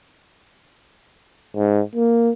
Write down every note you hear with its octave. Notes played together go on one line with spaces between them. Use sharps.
G#2
A#3